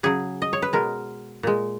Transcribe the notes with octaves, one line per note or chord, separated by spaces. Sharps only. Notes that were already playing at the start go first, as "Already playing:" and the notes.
C#3 F#3 G#4
D#5
C#5
B4
B2 G#3 A#4
A#2 G#3